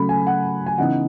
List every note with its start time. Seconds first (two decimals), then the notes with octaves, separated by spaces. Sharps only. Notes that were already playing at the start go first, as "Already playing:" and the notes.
Already playing: C#3 F#3 A3 B5
0.09 G#5
0.27 F#5
0.66 G#5
0.78 C#3 E3 B3 D#4 F#5